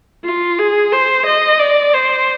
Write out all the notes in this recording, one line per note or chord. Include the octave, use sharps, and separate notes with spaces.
F4
G#4
C5
D#5
D5
C5